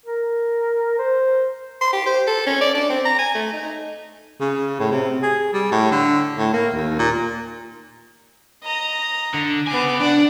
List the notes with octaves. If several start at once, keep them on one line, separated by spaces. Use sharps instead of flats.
A#4
C5
C6
G4
C5
A4
C#4
D5
D4
C4
A#5
G#5
A3
D#4
C#3
A2
C3
G#4
G3
A2
D3
A2
A#3
D#2
A#2
D#5 A#5
D3
C#3 B3 G#5 D6
D4 D5 F#5